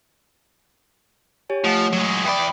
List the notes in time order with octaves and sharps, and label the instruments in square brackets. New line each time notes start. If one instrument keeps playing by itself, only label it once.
[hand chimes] G4 C#5 G#5
[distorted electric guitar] F3 [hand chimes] A3 C#5 F#5
[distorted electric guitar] F#3 G#3
[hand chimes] D#6
[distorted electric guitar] E2 D5 [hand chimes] G5 B5